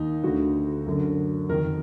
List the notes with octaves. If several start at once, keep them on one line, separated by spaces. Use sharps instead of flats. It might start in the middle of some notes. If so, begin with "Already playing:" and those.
Already playing: D#2 D#4
D2 D3 F#4
F#2 D3
F2 D#3 A#4